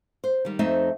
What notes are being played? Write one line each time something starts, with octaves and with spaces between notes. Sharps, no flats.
C5
D#3 G3
F2 A3 C4 D#4 D#5 E5